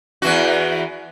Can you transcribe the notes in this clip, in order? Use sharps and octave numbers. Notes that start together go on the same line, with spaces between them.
E2 E3 F#4